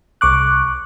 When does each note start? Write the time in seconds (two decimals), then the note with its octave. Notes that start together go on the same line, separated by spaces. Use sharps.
0.21 C2 C#6 D6 F#6